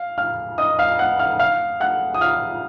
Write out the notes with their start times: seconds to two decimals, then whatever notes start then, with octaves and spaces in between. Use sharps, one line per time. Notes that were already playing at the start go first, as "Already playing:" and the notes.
Already playing: F5
0.18 F5 F6
0.58 D#5 D#6
0.79 F5 F6
0.99 F#5 F#6
1.19 F5 F6
1.39 F5 F6
1.80 F#5 F#6
2.14 D#6
2.21 F5 F6